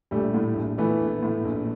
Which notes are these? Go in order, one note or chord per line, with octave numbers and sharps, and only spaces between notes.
A#1 G3 A3
A2
A#1
E3 A3 B3
A#1
A2
A#1